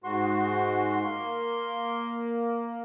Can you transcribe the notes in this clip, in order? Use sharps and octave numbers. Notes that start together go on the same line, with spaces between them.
G#2 F#4 C6
A#3